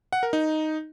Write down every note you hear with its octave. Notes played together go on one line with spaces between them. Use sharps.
F#5
A#4
D#4